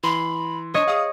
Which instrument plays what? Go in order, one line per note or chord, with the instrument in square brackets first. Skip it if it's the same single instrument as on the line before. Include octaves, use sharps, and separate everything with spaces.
[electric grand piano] E3 [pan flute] B5 [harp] C6
[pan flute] D4 [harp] C#5 D#5
[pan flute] G#4 [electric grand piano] F5 D#6